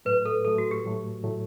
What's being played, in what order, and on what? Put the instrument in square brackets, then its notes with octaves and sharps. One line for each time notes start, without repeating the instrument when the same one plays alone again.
[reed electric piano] A2 F#3 A3 [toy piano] B4
[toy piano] A4
[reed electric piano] A2 F#3 A3 [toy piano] A4
[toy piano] F#4
G4
[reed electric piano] A2 F#3 A3
A2 F#3 A3